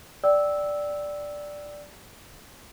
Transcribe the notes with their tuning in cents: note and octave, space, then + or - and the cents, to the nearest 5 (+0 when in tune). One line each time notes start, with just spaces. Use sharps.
D5 +0 G5 -15 E6 -10